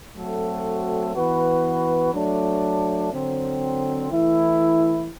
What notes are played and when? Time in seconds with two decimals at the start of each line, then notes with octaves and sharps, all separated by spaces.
0.16 F#3 A3 C4 F#4 A4
1.14 E3 B3 F#4 B4
2.13 F#3 A3 D4
3.12 D3 F#3 C4
4.11 E3 A3 E4